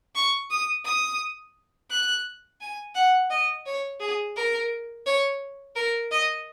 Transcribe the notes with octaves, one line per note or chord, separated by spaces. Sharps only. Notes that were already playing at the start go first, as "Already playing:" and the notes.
C#6
D#6
D#6
F#6
G#5
F#5
D#5
C#5
G#4
A#4
C#5
A#4
D#5